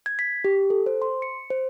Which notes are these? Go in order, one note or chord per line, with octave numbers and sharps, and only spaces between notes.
G#6
B6
G4
A4
C5
C6
C#7
C5